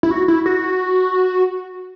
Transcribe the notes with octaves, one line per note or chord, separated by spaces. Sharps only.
E4
F#4
E4
F#4